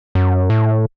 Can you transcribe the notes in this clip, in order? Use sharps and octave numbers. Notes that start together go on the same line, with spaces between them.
F#2
A2